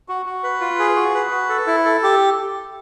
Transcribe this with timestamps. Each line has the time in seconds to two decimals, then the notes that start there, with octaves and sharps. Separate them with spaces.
0.09 F#4
0.26 F#4
0.43 B4
0.61 F4
0.79 G#4
0.96 F#4
1.15 B4
1.31 F#4
1.49 A4
1.67 E4
1.85 A4
2.03 G4